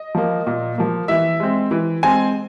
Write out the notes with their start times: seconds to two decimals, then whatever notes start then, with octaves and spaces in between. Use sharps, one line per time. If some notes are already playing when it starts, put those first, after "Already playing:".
Already playing: D#5
0.15 F3 A#3
0.47 A#2
0.78 F3 A#3
1.08 E3 E5
1.40 G#3 C4
1.71 E3
2.03 G#3 C4 G#5